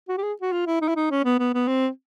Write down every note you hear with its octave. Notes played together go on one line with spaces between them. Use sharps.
F#4
G4
G#4
F#4
F4
E4
D#4
E4
D#4
C#4
B3
B3
B3
C4